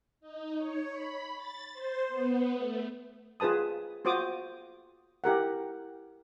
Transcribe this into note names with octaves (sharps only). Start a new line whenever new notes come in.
D#4
C#5
B5
A6
C5
B3
A3
F4 G#4 B4 A5 D#6
F4 F#4 C5 D6 D#6
E4 G4 A#4 F#5